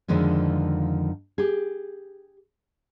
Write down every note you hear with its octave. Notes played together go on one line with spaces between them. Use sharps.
F2 D3 D#3 F3 G#3
G4 G#4